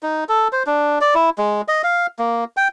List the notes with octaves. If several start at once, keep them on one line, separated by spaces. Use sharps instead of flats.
D#4
A4
C5
D4
D5
E4
G#3
D#5
F5
A#3
G5